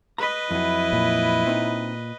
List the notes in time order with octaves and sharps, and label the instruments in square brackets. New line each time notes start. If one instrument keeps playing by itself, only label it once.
[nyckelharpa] B4 D#5 [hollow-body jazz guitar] A#5 B5
[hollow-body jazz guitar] F2 F#3 [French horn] E4
[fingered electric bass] A#2
[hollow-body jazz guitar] C4 D#4